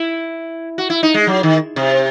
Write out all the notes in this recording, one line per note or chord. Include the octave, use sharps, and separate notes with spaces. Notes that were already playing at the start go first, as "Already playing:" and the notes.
Already playing: E4
F#4
E4
D#4
G#3
F#3
D#3
C3